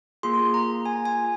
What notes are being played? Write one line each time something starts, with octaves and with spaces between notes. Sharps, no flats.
A#3 F4 G#4 C6
A#5
G#5
G#5